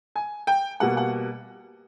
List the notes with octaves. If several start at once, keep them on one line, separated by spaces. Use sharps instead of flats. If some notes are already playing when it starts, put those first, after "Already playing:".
G#5
G5
B2 G3 A#3 F#5
F#5